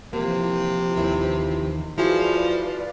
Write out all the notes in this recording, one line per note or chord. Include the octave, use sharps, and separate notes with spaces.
C3 E3 F3 A#3
D#2 D#3 E4
F3 E4 F#4 G#4 B4 D5 F5